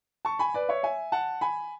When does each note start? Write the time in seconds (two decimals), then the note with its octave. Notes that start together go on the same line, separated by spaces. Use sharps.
0.25 A5 C#6
0.39 G#5 B5
0.54 B4 D5
0.69 C#5 E5
0.83 E5 G#5
1.12 F#5 A5
1.41 G#5 B5